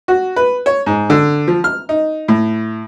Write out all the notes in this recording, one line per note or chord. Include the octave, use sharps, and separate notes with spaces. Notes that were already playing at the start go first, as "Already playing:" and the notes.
F#4
B4
C#5
G#2
D3
F3
F6
D#4
A2